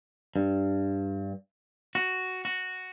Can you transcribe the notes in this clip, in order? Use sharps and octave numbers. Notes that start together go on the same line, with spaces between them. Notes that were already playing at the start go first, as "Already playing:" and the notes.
G2
F#4
F#4